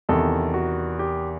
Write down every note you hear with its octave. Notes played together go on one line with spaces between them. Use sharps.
E2 C3 D#3 A4
F#4
G4